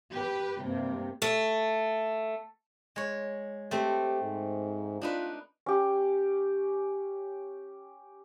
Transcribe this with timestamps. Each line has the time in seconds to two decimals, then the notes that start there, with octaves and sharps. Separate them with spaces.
0.13 G4 B4
0.63 G2 C3 A#3
1.22 A3
2.96 G#3 C#5
3.71 A3 C4 G4
4.22 G#2
5.01 D4 D#4 F4 B4
5.66 C#4 G4